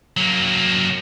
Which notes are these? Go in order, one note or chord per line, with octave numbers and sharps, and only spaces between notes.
F#3 A#3